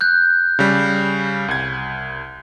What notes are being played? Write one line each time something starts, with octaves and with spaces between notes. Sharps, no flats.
F#6 G6
C#3 G3
C2 G#6